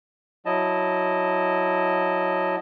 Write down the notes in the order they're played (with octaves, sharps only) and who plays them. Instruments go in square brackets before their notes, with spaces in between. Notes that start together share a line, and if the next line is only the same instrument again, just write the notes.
[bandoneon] F#3 E4 D#5 A5